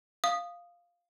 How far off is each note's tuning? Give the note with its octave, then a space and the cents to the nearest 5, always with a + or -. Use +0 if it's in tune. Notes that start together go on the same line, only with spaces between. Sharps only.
F5 +0 D#6 -10